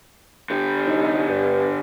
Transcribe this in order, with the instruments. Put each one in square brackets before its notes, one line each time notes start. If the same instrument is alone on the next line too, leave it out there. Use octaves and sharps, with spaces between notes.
[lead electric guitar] D3 G4
[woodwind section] C2 F#3 D#4
G2